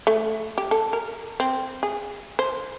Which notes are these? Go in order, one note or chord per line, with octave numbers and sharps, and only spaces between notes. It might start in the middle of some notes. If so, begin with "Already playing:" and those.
A3
G4
A4
A#4
C4
G#4
C5